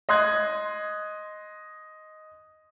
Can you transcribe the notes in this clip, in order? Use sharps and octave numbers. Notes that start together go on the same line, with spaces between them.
D#5 C6 D#6 F#6 G#6